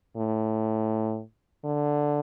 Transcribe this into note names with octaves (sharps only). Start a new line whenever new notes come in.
A2
D3